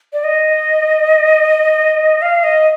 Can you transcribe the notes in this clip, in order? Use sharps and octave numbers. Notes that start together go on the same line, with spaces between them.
D5
D#5
F5
D#5